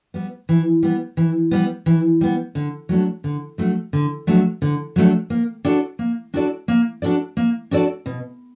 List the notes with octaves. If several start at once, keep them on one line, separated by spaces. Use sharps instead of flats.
G3 B3
E3
G3 B3
E3
G3 B3
E3
G3 B3
D3
F#3 A3 D4
D3
F#3 A3 D4
D3
F#3 A3 D4
D3
F#3 A3 D4
A#3
D4 F#4 A4 D5
A#3
D4 F#4 A4 D5
A#3
D4 F#4 A4 D5
A#3
D4 F#4 A4 D5
B2